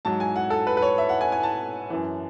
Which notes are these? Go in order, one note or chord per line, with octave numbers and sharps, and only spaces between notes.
G#2 F#3 A5
G#5
F#5
A4
B4
B4
C#5
E5
F#5
G#5
G#5
A5
F#2 E3